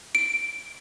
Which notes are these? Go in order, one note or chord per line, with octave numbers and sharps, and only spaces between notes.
D7